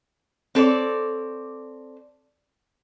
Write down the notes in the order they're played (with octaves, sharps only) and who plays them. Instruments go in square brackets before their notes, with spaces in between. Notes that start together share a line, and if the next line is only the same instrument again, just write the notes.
[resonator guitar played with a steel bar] C4 A4 C#5 D5